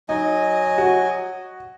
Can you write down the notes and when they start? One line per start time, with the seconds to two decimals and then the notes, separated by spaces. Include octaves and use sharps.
0.09 F#3 D#4 D#5 G#5
0.78 F#4